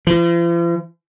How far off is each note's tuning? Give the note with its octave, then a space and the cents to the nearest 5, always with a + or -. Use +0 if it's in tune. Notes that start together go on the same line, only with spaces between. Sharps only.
F3 -45